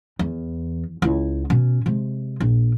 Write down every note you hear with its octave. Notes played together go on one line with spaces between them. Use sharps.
E2
C#2 E4
B2 C#4
C3 G#3
A#1